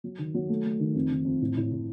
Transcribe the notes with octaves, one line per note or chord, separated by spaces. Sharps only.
F#3
D#3
F#3
A3
A3
D#3
F2
D#3
F2
A2
A2
A2